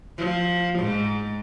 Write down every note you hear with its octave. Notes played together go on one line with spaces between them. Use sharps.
F3
G#2